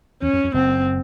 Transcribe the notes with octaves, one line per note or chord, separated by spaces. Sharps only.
E2 C#4
F2
F2
F#1 F#2 C4